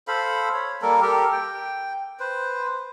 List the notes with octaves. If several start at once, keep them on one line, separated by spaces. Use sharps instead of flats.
A4 C5 F5 B5
C#5
G3 A#3 A4 A#4
G4 A4 A#4
G5
B4 C5